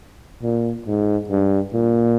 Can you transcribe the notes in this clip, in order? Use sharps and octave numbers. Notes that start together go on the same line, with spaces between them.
A#2
G#2
G2
A#2